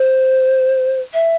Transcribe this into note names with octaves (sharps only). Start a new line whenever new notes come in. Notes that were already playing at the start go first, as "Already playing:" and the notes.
Already playing: C5
E5